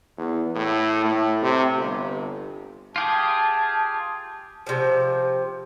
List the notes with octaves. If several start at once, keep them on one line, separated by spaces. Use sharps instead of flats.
E2
A2
A2
C3
G1
F4 G4 G#4 A5
C3 F3